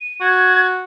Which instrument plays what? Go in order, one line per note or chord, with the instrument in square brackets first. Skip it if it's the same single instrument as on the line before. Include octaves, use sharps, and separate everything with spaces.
[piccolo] D#7
[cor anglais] F#4 [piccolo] G#6